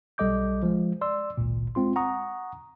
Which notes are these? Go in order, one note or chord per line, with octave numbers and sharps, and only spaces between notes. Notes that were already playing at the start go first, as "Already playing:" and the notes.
B1 G3 A4 D#5 D6 G6
F3 G#3
D5 C6 E6
G#1 C#2 A#2
G#3 C4 F4 C6
F#5 A#5 C#6 D#6